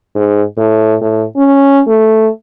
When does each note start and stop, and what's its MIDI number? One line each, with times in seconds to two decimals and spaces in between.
0.15 0.43 44
0.58 0.95 45
1.01 1.24 45
1.37 1.81 61
1.87 2.29 57